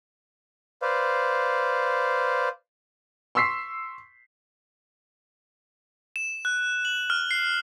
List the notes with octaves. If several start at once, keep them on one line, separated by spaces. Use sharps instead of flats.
B4 C5 D5 F5
C6 C#6 E6 B6 C7
E7
F#6
F#7
F6
C7